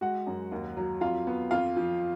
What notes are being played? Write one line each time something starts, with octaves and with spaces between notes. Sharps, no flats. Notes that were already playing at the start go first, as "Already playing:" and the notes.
G#3 F#4 F#5
F#2
D#2
F#3
F2 F4 F5
B3
F2 F4 F5
F3